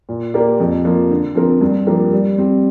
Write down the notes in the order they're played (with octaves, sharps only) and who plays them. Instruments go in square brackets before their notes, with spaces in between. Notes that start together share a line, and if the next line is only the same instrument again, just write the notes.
[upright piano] A#2
A#3 G4 A#4 D5
F2
F3 A#3
D3
F3 C4 A#4
G2
F3 A#3 G4 A#4
G3
C4 G4